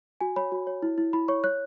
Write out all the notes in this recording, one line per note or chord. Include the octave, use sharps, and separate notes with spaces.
F#4 G#5
C#5 B5
F#4
C#5
E4
E4
E4 B5
C#5 C#6
C#5 F#6